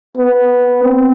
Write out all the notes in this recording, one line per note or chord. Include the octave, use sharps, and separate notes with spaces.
B3
C4